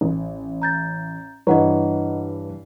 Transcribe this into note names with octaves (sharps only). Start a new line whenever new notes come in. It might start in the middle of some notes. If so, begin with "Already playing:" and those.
A1
A#5 G6 A6
G2 E3 G3 B4 C#5 D#5 F#5 A#5